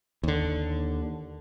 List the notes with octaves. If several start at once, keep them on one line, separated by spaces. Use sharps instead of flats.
D#2 D3